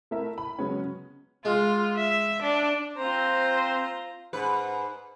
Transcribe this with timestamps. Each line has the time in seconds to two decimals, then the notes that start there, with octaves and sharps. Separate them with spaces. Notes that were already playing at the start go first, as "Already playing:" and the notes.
0.11 A3 E4 A#4 E5
0.38 B5
0.58 C#3 F#3 G#3 B3 C#4
1.45 G#3 F4
1.96 E5
2.43 D4
2.98 C4 F4 C5 A#5
4.33 G#2 B4